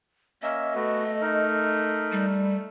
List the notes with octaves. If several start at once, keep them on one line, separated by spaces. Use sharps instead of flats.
A#3 C#4 D#5 E5
A3 B3 F#4
D#4 A#4
G3